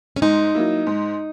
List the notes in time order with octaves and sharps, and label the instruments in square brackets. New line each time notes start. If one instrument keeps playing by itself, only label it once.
[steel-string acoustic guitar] C#4
[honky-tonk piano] G#2 [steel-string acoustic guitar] D#4
[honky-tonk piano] F#3 A#3 E4
G#2